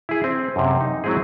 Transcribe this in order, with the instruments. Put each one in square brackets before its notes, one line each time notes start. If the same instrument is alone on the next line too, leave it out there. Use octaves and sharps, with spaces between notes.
[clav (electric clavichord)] E4 G#4
C4
F#2 C3
D#4
F#3 G#3 C4 E4 G#4